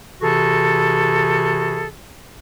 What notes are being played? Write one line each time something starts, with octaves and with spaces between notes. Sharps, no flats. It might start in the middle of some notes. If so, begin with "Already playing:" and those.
C3 E3 F#4 G#4 A4